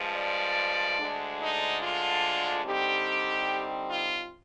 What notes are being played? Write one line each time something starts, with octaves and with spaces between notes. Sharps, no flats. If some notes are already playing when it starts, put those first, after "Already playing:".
Already playing: G2 F3 G#3
D5
D2 D3 G#3 D4
D#4
F4
D3 G3 C4 D#4 G4
F4